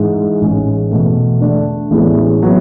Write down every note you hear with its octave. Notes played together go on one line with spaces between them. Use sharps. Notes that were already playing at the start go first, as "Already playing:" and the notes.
Already playing: G#2 E3 G#3
A1 G#2 G#3 C#4
E2 B2 A3
D3 A3 D4
A1 A2 G#3 B3 E4
F#3 B3 E4